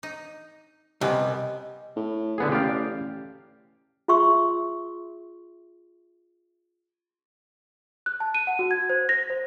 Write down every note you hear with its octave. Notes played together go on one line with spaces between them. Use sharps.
D#4
C2 C#3 B3 C4 G4 D#5 G#5
A2
D3 B3 G#4
A1 G4 D5 F5
F4 G#4 E5 C6 C#6 E6
F#6
A5
D#7
F#5
F#4
G#6
C5
A#6
C5